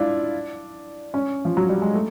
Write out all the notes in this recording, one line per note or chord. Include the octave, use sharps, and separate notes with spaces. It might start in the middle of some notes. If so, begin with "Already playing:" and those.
Already playing: D4 E4 F4
C#4
F3
F#3
G3
G#3
A3